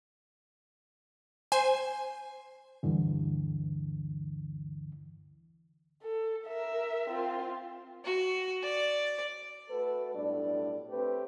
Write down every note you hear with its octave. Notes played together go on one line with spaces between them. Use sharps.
C5 G#5
D2 G2 D3 E3
A4
A#4 E5
C4 F4
F#4
D5
A3 F#4 A4 B4
B1 A2 G3 D4 D5
A3 C4 G4 B4